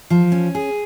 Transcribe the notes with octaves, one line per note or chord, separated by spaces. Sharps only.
F3
C#4
G#4